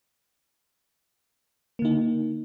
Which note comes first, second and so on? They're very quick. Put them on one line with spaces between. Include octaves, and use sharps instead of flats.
A#3 D3 D#4